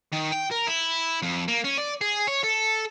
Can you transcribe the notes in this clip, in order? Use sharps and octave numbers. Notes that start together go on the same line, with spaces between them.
D#3
G5
A#4
E4
F2
A#3
C#4
D5
G#4
C#5
A4